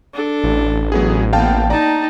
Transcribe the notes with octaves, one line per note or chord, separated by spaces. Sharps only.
D4 A4
A1
F#3 B3 G#4
A#3 B3 F5 G5 A5
D#4 D5 G5 A5 A#5